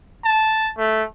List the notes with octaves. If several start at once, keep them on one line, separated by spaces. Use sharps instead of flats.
A5
A3